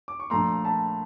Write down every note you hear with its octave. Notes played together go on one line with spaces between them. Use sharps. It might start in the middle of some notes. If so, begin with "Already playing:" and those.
D6
C#6
A#1 A#2 F3 A3 A#5 C6
A5 B5